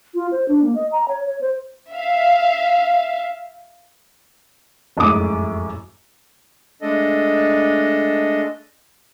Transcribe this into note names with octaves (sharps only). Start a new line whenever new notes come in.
F4
C5
D4
A#3
D#5
A#5
C#5
C#5
C5
E5 F5
F1 F#2 A2 G#3 D6 D#7
G#3 A3 D4 A4 D#5